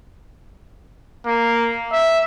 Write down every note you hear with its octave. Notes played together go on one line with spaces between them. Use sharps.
A#3
E5